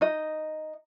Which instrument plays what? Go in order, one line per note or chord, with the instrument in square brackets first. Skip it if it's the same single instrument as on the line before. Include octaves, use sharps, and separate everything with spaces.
[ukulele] D#4 D#5